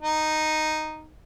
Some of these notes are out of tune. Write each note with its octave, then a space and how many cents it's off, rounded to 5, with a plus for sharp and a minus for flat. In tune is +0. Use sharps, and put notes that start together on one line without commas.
D#4 -5